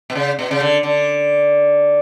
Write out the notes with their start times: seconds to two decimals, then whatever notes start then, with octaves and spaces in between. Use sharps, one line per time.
0.10 B2
0.15 C#3
0.39 B2
0.51 C#3
0.61 D3
0.83 D3